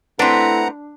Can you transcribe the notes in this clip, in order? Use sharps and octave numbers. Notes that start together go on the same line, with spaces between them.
A3 C4 D4 E4 B4 F#5 A#5